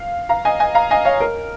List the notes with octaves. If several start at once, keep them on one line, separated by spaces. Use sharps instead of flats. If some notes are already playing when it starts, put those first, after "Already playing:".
Already playing: F5
F5 A#5
D#5 G#5
D#5 G#5
F5 A#5
D#5 G#5
C#5 F5
A#4